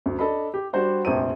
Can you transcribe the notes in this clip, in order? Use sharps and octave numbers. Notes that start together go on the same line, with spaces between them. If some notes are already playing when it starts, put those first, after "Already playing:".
D2
D4 A4 D#5 B5
G4
G3 D4 F#4 C5 F#5
F1 A#1 C5 D#7